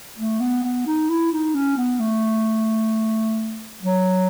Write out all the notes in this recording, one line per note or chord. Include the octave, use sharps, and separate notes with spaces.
A3
B3
B3
D#4
E4
D#4
C#4
B3
A3
F#3